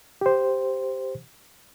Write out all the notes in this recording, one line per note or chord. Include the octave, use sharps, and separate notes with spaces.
G4 C5